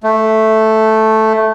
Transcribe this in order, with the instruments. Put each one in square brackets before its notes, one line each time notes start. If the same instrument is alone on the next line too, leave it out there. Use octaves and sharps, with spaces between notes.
[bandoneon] A3